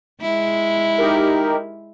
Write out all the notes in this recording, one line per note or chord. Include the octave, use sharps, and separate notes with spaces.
G#3 E4
D#4 G4 A#4